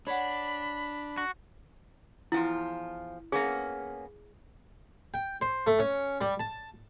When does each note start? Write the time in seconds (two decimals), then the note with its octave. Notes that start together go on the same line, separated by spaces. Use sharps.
0.07 D4 C#5 F#5 B5
1.18 F#4
2.32 E2 F3 E4 F4
3.32 A#3 B3 C#4 G#4
5.14 G5
5.41 C5
5.67 A3
5.79 C#4
6.21 G3
6.40 A5